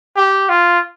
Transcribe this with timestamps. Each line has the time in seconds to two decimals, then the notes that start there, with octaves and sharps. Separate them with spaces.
0.16 G4
0.49 F4